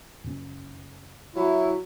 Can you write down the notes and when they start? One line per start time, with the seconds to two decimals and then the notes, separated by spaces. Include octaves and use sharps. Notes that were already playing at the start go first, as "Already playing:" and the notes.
0.24 F#2 C#3 C#4
1.36 F#3 E4